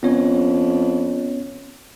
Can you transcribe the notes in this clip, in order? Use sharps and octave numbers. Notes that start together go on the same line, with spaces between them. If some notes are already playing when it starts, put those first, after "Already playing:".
F2 B3 C#4 C#5